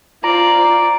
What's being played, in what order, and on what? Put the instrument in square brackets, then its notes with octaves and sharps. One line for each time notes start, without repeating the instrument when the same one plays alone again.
[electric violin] F4 C5 [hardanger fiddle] D5 [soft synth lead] A#5